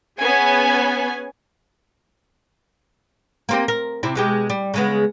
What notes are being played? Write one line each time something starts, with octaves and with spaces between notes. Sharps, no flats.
B3 C#4 G#4 G#5
A#3 C4 G4
A#4
C3 C4 E4
B2 G#3 G4
G3
C#3 G#3 B3